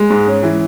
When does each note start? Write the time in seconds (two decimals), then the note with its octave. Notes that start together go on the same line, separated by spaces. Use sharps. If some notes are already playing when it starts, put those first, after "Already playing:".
Already playing: G#3
0.10 G#2
0.27 C#4
0.43 E3